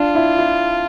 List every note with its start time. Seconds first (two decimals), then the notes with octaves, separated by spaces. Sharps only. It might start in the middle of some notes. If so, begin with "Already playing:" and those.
Already playing: D4 F4
0.15 E4
0.38 E4